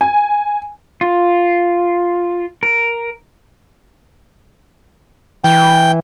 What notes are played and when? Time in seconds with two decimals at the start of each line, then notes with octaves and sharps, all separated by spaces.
0.01 G#5
1.01 F4
2.63 A#4
5.44 E3 G5